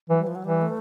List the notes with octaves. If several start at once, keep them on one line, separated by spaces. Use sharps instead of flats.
E3 F#3
G3
F3
F#3
E3 G3
A3